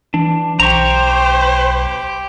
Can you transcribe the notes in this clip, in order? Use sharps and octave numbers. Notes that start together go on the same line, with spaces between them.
E3 D4
B1 G4 C5 A#5 C#6